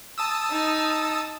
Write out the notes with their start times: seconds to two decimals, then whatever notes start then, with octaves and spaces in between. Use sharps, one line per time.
0.18 A5 D#6 E6
0.51 D#4